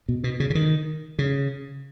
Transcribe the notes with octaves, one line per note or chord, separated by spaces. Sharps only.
B2
B2
C#3
C#3
D#3
C#3